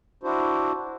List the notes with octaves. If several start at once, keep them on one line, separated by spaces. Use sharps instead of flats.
D4 E4 F#4 C5